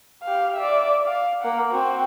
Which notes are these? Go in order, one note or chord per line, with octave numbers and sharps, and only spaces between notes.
G4 F5
D5 E5
F5
A#3 F#5
C4 F#4